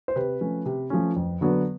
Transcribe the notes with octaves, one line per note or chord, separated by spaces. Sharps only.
C5
C3 B4
F3 A3 C#4
C3
F3 A3 C#4
F2
D3 F#3 B3